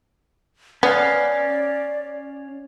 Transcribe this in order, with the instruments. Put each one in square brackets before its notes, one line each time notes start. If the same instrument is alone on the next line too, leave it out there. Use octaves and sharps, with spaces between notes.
[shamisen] B3 [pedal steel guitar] C#4 F5 [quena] D5